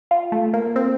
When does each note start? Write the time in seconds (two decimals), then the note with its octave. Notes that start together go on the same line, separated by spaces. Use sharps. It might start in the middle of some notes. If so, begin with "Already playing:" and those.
0.11 F4
0.32 A3
0.54 A#3
0.76 C4